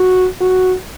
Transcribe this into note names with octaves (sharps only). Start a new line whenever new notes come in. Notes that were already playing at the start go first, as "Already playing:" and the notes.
Already playing: F#4
F#4